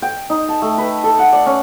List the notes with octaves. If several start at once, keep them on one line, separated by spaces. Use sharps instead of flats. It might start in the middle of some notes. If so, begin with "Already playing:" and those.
G5
D#4
A5
A3
B4
A4
F#5
D5
C#4